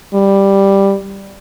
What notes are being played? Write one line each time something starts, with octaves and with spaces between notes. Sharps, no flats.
G3